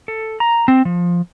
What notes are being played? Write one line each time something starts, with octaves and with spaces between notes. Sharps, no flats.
A4
A#5
C4
F3